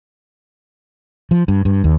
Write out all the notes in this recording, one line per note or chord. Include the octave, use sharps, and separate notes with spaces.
F3
G2
G2
D#2